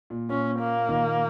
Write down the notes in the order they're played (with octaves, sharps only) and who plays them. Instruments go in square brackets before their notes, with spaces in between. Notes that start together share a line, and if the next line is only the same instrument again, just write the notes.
[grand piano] A#2
[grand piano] A#2 [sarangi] C#4
[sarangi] A#3
[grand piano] A#2 D#3